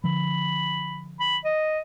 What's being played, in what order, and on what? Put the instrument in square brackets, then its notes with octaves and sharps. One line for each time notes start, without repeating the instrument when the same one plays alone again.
[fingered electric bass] D3 F3 [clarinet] B5
[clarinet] B5
D#5